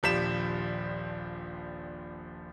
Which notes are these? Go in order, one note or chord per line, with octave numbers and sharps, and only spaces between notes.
D#1 A#1 F3 G4 B6 E7